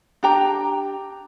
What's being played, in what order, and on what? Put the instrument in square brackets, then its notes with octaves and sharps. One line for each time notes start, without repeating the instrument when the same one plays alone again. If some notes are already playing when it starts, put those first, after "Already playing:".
[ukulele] D4 G4 G5 A#5